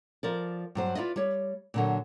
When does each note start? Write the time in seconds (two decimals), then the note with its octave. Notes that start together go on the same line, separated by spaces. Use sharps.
0.23 F3 A#4 D5
0.75 G2 F#3 C5
0.95 E4 F4 B4 D5 D#5
1.16 G3 C#5
1.74 A#2 D3 F#3